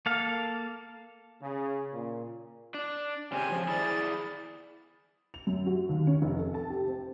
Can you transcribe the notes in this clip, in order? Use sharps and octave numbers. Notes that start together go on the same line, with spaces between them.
A#3 A4 F5
C#3
A#2
D4
C#3 C4 G4 G#5
F3
E4 G#4 D5 A6
F7
F#2
F#4
D#2
C#4
F1
A4
A5
G4
C4